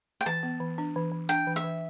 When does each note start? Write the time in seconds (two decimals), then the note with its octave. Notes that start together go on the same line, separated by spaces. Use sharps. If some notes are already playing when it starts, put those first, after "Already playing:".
0.21 G5
0.26 E3 A5
0.43 B3
0.60 E3
0.78 D4
0.96 E3
1.12 E3
1.29 D4 G5
1.47 E3
1.56 E5
1.64 E3